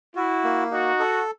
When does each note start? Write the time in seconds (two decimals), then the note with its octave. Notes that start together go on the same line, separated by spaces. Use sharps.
0.15 E4 F#4
0.44 A#3
0.71 D#4 F#4
1.00 A4